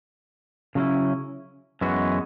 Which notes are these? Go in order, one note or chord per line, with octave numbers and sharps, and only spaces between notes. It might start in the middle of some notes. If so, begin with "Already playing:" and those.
C#3 F#3 C#4 E4
F#2 E3 G#3 B3 F#4